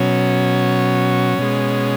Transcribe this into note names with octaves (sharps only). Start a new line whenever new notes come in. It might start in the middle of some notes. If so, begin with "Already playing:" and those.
Already playing: B2 F#3 C#4
B2 G#3